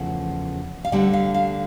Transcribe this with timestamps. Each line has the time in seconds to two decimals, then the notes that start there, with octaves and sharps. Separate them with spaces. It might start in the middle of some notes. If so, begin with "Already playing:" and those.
Already playing: E2 C#3 F3 A3 F#5
0.85 F5
0.92 D2 D3 G3 F#5
1.13 F5
1.34 F5